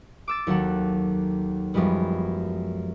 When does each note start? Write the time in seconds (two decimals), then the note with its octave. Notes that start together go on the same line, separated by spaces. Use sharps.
0.28 D6 E6 A6
0.47 D#2 F#3 A4 F#5
1.74 F#2 F3 G3 G#3 B3